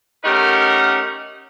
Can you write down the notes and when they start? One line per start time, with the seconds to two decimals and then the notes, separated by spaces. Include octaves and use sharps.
0.24 A3 C#4 D#4 G4 A#4 F#5